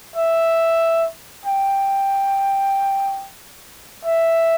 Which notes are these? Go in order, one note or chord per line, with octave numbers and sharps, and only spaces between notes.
E5
G5
E5